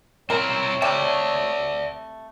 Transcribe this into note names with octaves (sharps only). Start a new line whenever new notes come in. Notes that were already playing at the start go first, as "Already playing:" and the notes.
C4 E4 A#4 C#5
C3 G3 A3 D5 E5